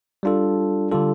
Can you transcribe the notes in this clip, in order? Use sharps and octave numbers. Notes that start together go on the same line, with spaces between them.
G3 D4 F4 A4
D3 G3 F4 A4